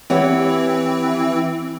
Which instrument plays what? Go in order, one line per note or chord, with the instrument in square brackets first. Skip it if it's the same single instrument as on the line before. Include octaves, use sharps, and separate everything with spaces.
[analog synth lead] E3 [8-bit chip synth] C4 [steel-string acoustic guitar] G4 C#5 F#5